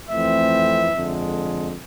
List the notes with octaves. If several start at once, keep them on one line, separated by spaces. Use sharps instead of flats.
F2 E3 A3 C4 E5
F2 D3 G#3